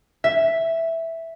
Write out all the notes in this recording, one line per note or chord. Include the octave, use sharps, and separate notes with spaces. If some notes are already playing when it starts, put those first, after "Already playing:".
E5